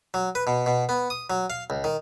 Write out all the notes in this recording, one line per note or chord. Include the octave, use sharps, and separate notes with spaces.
F#3
B4
B2
B2
B3
D#6
F#3
F5
C#2
D#3